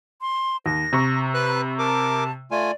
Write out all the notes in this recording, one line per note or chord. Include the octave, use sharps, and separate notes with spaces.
C6
D#2 A#6
C3 A#5 C#6
B4 B5 F#6
A#4 A5 D6
A3 F4 D5 G#5